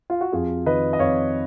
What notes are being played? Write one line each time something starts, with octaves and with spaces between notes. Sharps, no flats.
F4
F#4
F2 F4 G#4
D#3 B4 D#5
D#5
F2 C#5 F5